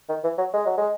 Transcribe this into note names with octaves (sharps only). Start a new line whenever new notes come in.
D#3
E3
F#3
G#3
F#3
G#3